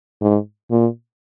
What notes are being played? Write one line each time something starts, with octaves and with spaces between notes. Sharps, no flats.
G#2
A#2